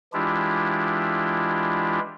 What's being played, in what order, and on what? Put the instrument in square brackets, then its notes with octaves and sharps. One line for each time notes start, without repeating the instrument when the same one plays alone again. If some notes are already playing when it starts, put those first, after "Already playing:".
[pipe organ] E3 G#3 D4 E4 F4 G4